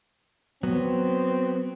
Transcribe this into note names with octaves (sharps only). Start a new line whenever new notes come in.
F#3 B3 C4